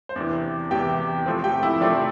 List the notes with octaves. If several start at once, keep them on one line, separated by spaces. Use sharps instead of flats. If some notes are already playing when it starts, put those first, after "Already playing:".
C5
E2 C3 E3 D4 D5
E2 C3 E3 G4 G5
C3 F3 A3 C4
G4 G5
E4 E5
C3 F3 A3 C4 D4 D5